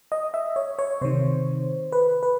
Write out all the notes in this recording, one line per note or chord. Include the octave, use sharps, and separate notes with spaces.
D#5
E5
C#5
C#5
C3 D#3 C5
B4
B4